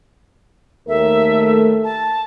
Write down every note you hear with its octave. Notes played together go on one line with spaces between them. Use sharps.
D#2 A3 A#4 E5
A5